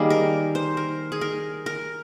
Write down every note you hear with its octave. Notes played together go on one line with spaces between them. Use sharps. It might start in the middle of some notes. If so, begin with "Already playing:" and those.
Already playing: D#3 G3 A#3 G#4
A#4
C5
A#4
G#4
A#4
A#4